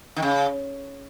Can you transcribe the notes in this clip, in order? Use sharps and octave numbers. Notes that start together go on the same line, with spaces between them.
D#3
C#3